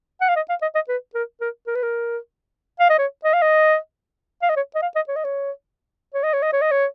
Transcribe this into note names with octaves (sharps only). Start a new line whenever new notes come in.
F#5
F5
D#5
F5
D#5
D#5
B4
A#4
A#4
A#4
B4
A#4
F5
D#5
C#5
D#5
F5
D#5
F5
D#5
C#5
D#5
F5
D#5
C#5
D#5
C#5
C#5
D#5
C#5
D#5
C#5
D#5
C#5